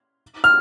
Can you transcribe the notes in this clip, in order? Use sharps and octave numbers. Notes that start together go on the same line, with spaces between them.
F6